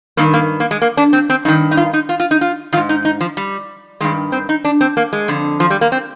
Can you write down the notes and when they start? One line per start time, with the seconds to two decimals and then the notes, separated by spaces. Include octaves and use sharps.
0.17 G2 D#3 A#3
0.34 A#3
0.60 A#3
0.71 G#3
0.82 A#3
0.97 D4
1.13 C4
1.30 C4
1.45 G2 D#3 D#4
1.71 D#4
1.77 F4
1.93 D#4
2.09 F4
2.20 F4
2.31 D#4
2.41 F4
2.73 D#3 F4
2.77 G#2
2.89 D#4
3.05 D#4
3.21 F3
3.37 G3
4.01 G2 D#3 G#3
4.32 C4
4.49 D#4
4.65 D4
4.81 C4
4.97 A#3
5.13 G#3
5.28 F2 D3
5.60 F3
5.70 G3
5.81 A#3
5.92 C4